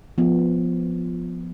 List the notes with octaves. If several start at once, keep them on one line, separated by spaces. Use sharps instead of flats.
F3 B3